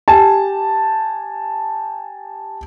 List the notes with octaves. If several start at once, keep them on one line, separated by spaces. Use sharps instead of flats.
G4 G#5 A5